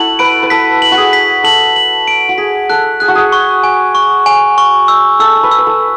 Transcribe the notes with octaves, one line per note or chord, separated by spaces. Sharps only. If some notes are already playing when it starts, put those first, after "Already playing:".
Already playing: E4 F#4 A4 F#7
B4 D7
B4
A4 B6
F#7
F#4
G#4
B6
A4 F#7
F#7
D7
F#4
G#4 B6
A4 F#6
G#4 F#6
F#4
G#4
C#6
G#5
C#6
G#5
C#6
E6
A4 E6
B4
E6
B4
A4